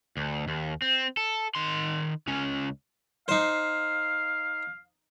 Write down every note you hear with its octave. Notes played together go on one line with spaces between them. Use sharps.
D2
D#2
C4
A4
D#3 C6
C#2 C#4
D#4 C5 F5